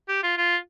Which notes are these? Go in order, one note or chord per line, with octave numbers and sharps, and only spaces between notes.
G4
F4
F4